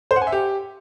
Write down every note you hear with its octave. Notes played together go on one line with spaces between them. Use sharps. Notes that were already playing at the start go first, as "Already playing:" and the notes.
C5
F#5
G#5
E5
G4